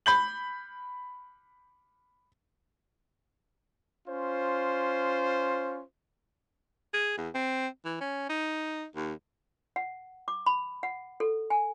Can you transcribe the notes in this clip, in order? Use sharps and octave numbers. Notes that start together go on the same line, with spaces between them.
B5 G6 F#7
C#4 F4 C5
G#4
E2
C4
E3
C#4
D#4
D#2
F#5
D6
B5
F#5
A4
G#5